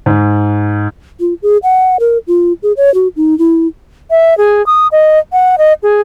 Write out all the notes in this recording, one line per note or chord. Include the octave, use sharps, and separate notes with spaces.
G#2
F4
G#4
F#5
A#4
F4
G#4
C#5
F#4
D#4
E4
E5
G#4
D#6
D#5
F#5
D#5
G#4